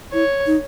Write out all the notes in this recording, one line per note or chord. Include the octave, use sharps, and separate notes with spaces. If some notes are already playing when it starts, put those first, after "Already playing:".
E4 C#5
D#4